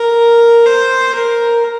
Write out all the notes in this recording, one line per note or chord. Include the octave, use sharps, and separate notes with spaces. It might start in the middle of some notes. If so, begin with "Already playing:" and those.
Already playing: A#4
C5
A#4